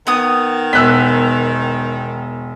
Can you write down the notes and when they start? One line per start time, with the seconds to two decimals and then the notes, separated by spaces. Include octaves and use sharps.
0.07 D#3 B3 D#6
0.73 E1 E6 F#6 B6